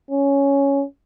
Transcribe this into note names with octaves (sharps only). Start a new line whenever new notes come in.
C#4